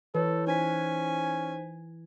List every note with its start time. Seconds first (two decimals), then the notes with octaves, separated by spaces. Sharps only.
0.15 E3 A4 B4 C#5
0.47 C#4 D#4 C5 G#5 B6